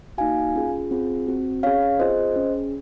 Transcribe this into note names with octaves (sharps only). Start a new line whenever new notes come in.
A#3 D#4 F#4 F5 G#5
C#4 F4 G#4
C4 F4 G#4
C4 F#4
C#4 G#4 C#5 F5
C4 F4 G#4 C5 D#5
C#4 G#4